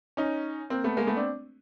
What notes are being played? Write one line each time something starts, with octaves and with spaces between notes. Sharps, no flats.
C#4 D#4
A#3 C4
A3 B3
G#3 A#3
A3 B3
C4 D4